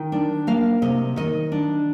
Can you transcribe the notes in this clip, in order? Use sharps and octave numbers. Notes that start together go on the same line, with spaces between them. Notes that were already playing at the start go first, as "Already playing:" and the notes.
Already playing: D#3 G5
D4
A#3 F5
C3 D#5
D#3 D#5
D4